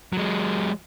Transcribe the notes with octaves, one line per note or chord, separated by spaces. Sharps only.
F#3 G#3